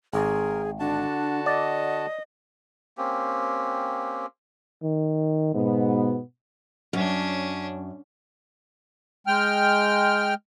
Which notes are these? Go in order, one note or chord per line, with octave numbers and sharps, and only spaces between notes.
G#1 G#4 A#4
D3 D4 F#4 A5
D5 D#5
A#3 C4 C#4 G4
D#3
G#2 B2 B3
F#2 C#4 D4
G#3 G5 F6